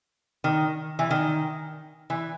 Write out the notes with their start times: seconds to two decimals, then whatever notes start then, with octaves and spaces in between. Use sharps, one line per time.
0.44 D#3
0.99 E3
1.11 D#3
2.10 E3